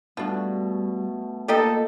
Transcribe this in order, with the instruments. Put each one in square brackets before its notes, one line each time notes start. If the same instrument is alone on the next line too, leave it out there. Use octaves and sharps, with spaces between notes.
[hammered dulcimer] B2 A3 [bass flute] G3 [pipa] D4 F4
[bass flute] A#3 [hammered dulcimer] D#4 [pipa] F4 G4 D#5 [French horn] A4